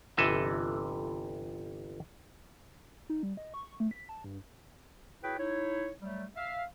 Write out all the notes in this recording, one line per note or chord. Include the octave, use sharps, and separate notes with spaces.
G1 C3 E3 A4 D#5 E5
D#4
G3
D#5
C#6
A3
B6
A5
G2
E4 F#4 G#4 B4 C#5 G5
D#4 E4 C#5
F#3 G3 A3
E5 F5